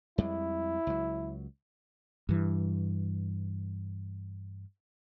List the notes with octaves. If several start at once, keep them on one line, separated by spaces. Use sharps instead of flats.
F2 G3 G#3 E4
C#2 F#3
G2 E3